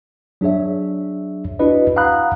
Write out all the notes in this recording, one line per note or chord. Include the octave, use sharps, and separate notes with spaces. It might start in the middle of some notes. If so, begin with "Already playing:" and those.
F#3 D4 G#4 C#5 E5
D4 E4 F#4 B4 D#5
F5 F#5 A#5 B5 D#6 F#6